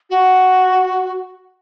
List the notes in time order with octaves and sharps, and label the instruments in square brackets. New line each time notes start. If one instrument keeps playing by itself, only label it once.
[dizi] F#4